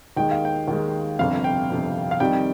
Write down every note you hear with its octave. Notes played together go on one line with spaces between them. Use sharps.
D#2 D#3 G#3 G5
F5
G5
D#2 D#3 G#3
G1 F2 C3 F5
G5
G1 F2 C3
F5
F2 C3 D#3 G3 G5